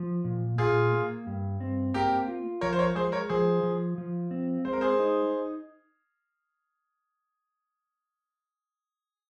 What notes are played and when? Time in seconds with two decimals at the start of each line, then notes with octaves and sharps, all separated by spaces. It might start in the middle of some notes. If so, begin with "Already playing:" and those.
Already playing: F3
0.24 A#2
0.58 A#2 F4 G#4
0.92 A#3
1.27 G2
1.60 C4
1.94 A#3 G4 A#4
2.28 F4
2.61 F3 A#4 C#5
2.73 C5
2.79 A#4 C#5
2.95 G#3 G#4 C5
3.12 A#4 C#5
3.29 F3 G#4 C5
3.63 F3
3.98 F3
4.31 C4
4.65 G#3 C5
4.73 A#4
4.81 G#4 C5
4.99 D#4